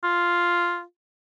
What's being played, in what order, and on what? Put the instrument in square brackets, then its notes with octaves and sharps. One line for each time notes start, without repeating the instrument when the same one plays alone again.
[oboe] F4